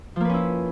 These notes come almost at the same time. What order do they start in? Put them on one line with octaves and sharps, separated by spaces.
F3 A#3 B4 C#4 E4